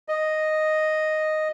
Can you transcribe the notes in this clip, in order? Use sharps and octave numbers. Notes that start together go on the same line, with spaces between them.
D#5